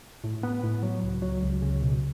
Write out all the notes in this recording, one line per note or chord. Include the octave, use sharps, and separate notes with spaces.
A2
B3
A2
F#3
C#2
F#3
C#2
C#3
B2